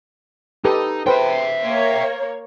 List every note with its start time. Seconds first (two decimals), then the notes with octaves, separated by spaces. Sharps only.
0.65 D#4 G4 A4 B4
1.07 B4 C5 E5 G5
1.64 A#3 C#5